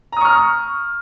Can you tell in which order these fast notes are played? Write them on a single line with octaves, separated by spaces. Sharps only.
A#5 D#6 C#6 F6